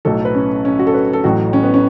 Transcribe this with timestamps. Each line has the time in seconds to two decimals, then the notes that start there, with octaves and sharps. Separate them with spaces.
0.05 B1 A2 F#3 A3 A4
0.25 B4
0.34 C#4
0.65 C#4
0.79 F#4
0.87 A4
0.94 B4
1.13 A4
1.24 A1 A2 F#3 F#4
1.53 C#4
1.63 B3
1.74 C#4